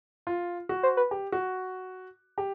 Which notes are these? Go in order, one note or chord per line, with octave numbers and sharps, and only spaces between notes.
F4
F#4
C5
B4
G4
F#4
G4